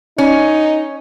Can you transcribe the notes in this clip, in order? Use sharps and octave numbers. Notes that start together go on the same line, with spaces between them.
C#4 D#4